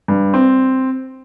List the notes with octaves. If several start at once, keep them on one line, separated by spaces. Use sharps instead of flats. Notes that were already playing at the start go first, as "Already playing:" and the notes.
G2
C4